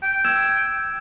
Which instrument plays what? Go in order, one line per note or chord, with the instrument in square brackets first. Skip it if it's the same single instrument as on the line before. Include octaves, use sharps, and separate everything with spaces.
[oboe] G5
[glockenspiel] E6 G#6 E7